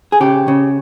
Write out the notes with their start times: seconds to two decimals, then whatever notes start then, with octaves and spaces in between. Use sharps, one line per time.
0.12 G#4
0.20 C#3 G4
0.48 C#3